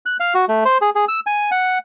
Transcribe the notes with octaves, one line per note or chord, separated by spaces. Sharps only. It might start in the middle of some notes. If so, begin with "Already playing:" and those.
F#6
F5
F#4
A3
C5
G#4
G#4
E6
G#5
F#5